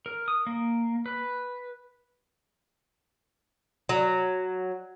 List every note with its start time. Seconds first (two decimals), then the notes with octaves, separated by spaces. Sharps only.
0.06 A#4
0.28 D#6
0.47 A#3
1.06 B4
3.89 F#3